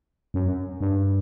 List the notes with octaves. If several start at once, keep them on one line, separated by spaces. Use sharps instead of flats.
F#2
G2